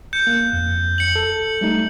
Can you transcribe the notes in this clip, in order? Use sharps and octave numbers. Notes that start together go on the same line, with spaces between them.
G6 C#7
A#3 F#6
F2
C#7 F#7
A4
G3 A3 D#4